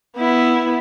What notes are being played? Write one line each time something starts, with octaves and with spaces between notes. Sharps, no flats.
B3 E4